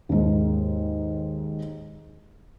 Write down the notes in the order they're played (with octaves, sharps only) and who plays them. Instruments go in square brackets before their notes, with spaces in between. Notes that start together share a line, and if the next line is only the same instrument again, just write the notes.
[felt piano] D#2 G#2